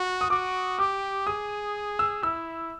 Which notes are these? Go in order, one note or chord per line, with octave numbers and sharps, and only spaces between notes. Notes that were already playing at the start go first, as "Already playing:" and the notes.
Already playing: F#4
D#6
F#4 D6
G4 D6
G#4 D#6
E6
E4 E6